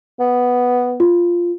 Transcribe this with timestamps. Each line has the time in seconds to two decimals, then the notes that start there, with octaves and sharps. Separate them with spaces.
0.20 B3
1.00 F4